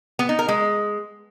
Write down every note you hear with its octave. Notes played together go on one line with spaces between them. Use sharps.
B3
D#4
A#4
G#3